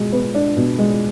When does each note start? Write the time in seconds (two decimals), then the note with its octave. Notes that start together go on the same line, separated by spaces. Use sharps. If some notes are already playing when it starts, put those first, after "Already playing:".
Already playing: B2 G#3
0.12 B3
0.35 D4
0.56 B2
0.78 G#3